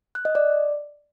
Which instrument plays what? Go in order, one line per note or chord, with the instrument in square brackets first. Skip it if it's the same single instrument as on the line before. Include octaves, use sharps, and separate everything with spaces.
[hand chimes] F#6
D#5
D5